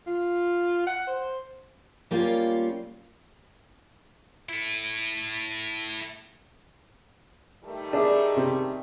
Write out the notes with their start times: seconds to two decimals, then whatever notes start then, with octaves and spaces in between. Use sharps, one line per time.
0.07 F4
0.87 F#5
1.07 C5
2.11 G3 A#3 C#4 F4
4.49 E4 A4
7.64 D#3 G3 A3
7.93 D4 G#4 E5
8.37 C3